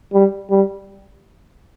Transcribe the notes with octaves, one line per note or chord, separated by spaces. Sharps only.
G3
G3